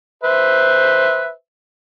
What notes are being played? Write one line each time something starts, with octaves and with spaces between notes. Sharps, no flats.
B4 C5 E5